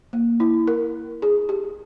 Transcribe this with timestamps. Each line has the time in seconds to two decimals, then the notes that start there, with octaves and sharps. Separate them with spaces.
0.13 A#3
0.40 E4
0.68 A#4
1.22 G#4
1.49 G4